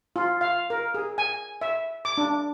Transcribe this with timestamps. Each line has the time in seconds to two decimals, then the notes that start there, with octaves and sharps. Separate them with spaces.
0.16 F4
0.41 F5
0.70 A#4
0.94 G#4
1.18 G#5
1.62 E5
2.05 D6
2.18 D4